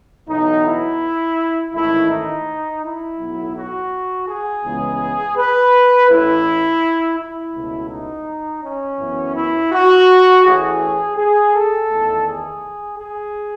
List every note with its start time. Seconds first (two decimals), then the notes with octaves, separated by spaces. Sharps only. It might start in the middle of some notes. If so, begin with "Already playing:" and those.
0.28 B1 A2 E3 B3 D#4
0.65 E4
1.73 A1 G#2 D#3 A3 E4
2.10 D#4
2.83 E4
3.18 B1 A2 F#3 B3
3.55 F#4
4.27 G#4
4.63 C#2 C#3 E3 G#3 B3
5.37 B4
6.08 A1 A2 E3 E4
7.18 E4
7.54 C#2 B2 A3
7.90 D#4
8.62 C#4
8.99 F#2 E3 B3
9.35 E4
9.72 F#4
10.44 A1 A2 E3 A3 G#4
11.17 G#4
11.53 A4
11.89 E2 D#3 A3
12.26 G#4
12.97 G#4